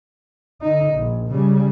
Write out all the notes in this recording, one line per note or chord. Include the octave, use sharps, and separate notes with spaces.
D3 D#4
A#1
C#3 G3